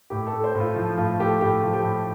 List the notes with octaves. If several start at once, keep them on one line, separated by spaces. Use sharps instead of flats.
A2 G4
A4
A3
C5
A2
F4
F3
A2 F4
A3 G4
A2 G4
F3
G4
A2